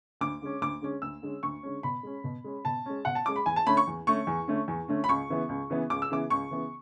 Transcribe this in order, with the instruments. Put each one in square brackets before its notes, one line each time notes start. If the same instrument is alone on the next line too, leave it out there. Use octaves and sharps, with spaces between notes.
[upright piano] D2 D6
D3 G#3 C#4
D2 D6
D3 G#3 C#4
D2 E6
D3 G#3 C#4
D2 C#6
D3 G#3 C#4
B2 B5
G#3 C#4
B2
G#3 C#4
B2 A5
G#3 C#4
B2 F#5
A5
G#3 C#4 D6
B5
E2 G#5
A5
D3 A3 C#4 B5
C#6
E2
D3 A3 C#4 C#6
E2
D3 A3 C#4
E2
D3 A3 C#4
B5
C#2 C#6
C#3 E3 B3
C#2
C#3 E3 B3
C#2 D6
E6
C#3 E3 B3 D6
C#2 C#6
C#3 E3 B3